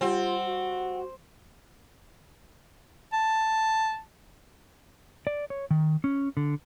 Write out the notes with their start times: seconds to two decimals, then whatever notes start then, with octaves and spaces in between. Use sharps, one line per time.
0.01 G3 C4 F4 F#5
0.46 F#4
3.13 A5
5.27 D5
5.50 C#5
5.71 D#3
6.04 C#4
6.37 D3